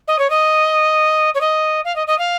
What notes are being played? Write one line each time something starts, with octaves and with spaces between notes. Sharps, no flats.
D#5
C#5
D#5
C#5
D#5
F5
D#5
D#5
F5